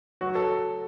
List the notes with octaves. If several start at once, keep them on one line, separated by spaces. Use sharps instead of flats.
F#3 F#4
A4